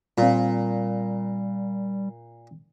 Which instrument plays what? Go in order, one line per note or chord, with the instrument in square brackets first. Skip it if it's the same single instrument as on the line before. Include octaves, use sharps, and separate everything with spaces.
[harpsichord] A#2 [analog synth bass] G3 [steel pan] C4 F4